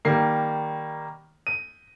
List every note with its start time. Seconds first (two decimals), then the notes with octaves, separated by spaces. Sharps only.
0.05 D#3 G3 A#3 C7
1.47 D#7